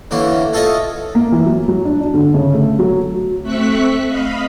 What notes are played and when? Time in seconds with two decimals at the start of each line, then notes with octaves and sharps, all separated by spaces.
0.11 D3 E3 A#3 C#4
0.53 F4 A4 C#5 D#5 E5
1.15 A#3
1.32 E3
1.46 F#3
1.68 F#3
1.85 D4
2.00 D4
2.14 D3
2.34 C#3
2.52 A3
2.79 F#3
3.43 A3 C4 E5 C#6 F#6 B6
4.06 D#5 F5 B5